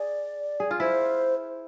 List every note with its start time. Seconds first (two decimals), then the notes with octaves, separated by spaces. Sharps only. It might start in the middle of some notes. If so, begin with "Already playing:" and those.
Already playing: G#4 D5
0.60 G#4
0.71 F4
0.80 E4 C5